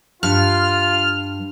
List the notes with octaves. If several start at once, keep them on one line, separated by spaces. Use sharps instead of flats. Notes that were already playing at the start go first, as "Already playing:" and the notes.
G2 F4 F6